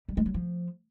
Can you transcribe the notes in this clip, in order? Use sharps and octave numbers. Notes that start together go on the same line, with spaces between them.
G3
G#3
F#3
F3